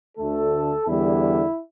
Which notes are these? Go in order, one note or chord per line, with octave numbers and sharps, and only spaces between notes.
D2 D3 A3 A4
E2 D3 G3 E4